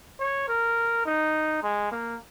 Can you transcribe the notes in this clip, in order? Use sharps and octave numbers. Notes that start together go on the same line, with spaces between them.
C#5
A#4
D#4
G#3
A#3